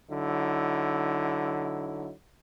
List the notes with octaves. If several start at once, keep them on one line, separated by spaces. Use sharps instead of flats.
D3 F#3 D#4 E4